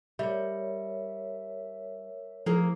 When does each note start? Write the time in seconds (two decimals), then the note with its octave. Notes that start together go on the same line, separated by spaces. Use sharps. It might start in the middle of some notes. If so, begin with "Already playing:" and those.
0.19 G3 A#4 C#5 E5
2.46 F3 A#3 E4 G#4 C5